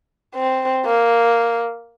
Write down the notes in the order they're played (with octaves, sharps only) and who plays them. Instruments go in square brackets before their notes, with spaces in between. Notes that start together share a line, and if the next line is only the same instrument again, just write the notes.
[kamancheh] C4
A#3